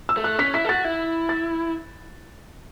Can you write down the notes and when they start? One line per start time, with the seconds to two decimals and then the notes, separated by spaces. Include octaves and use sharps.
0.09 E6
0.17 A3
0.24 F#6
0.39 C#4 B6
0.54 E4 B6
0.65 A4
0.69 F#4 A6
0.85 E4
1.29 A6